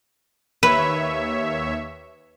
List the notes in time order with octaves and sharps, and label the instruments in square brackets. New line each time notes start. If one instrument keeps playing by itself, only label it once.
[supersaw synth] D#2 C#5 E5 [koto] B4